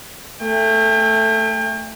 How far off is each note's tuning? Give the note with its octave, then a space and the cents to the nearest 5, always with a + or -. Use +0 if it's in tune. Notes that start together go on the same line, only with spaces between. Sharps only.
A3 +10 G5 +40